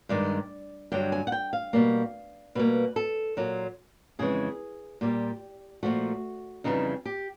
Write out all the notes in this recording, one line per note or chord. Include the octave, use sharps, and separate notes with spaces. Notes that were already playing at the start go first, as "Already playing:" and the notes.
G2 D#3 G#3 D5
G2 D3 F#3 G5
G#5
F#5
G5
F5
B2 G3 A#3
B2 G3 A#3 B4
A4
A#2 F#3 A#3
F2 C#3 E3 G#3 G#4
A#2 G3 A#3 G4
A#2 F3 A3 F#4
F2 C#3 E3 G3 D#4
G4